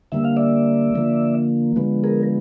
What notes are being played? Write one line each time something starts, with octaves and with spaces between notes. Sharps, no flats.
D3 G3 A#3 E5
F5
D5 E5
D3 F3 A#3
D3 F3 G#3 B3
G#4 A#4